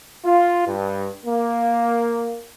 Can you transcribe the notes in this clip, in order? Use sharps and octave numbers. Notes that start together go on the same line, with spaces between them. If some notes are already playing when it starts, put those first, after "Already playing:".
F4
G2
A#3